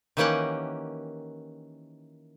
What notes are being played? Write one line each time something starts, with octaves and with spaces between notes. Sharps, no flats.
D#3 E3 A#3 C#4 G4 F#5